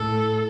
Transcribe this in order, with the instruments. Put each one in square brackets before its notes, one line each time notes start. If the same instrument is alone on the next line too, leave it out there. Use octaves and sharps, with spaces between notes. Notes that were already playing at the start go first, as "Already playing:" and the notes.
Already playing: [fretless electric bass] A2 [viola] A4